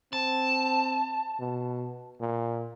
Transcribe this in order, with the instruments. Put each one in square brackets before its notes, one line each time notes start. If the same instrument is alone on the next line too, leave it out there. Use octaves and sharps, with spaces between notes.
[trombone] C4 [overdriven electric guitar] A5
[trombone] B2
A#2